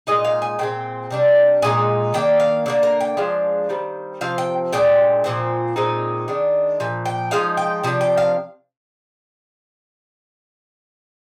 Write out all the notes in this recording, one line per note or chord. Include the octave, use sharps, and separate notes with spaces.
A#2 G#3 D#4 D#5
F5
G#5
A#2 G#3 C4 G5
C3 G3 D4
A#2 G#3 D#4 G#5
D#3 A#3 D4 G5
F5
D3 F3 A#3 D5
A#4
G5
F3 G#3 D4 F5
D#3 G3 C4
C3 F3 C4 F5
G5
A#2 G#3 D4 G5
A#2 F3 C4
A#2 G#3 C4 D#4
D#3 G#3 D4
A#2 F3
G5
F3 G#3 D#4 F5
G5
C3 F3 D4
G5
F5